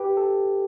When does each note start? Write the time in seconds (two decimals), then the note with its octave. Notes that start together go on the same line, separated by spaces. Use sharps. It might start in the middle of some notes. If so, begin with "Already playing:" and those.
Already playing: G4 B4
0.17 A4